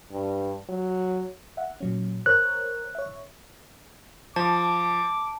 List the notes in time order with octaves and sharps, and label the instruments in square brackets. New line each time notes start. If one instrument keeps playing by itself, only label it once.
[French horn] G2
F#3
[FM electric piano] E5 F#5
A#2 F#3 C#4
[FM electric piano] A#4 C5 C#5 [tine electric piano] F#6
[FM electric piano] C#5 E5
[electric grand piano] F3 [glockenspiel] A5 [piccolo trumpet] D6